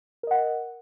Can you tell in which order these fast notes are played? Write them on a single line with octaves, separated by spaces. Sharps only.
A#4 D#5 F#5